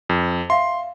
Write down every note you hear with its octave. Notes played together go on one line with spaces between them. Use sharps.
F2
E5 F5 C6